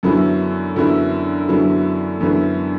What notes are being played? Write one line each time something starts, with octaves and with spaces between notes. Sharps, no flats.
F#2 D3 F#3 B3 E4
F#2 D3 F#3 B3 E4
F#2 D3 F#3 B3 E4
F#2 D3 F#3 B3 E4